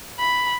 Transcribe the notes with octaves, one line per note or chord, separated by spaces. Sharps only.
B5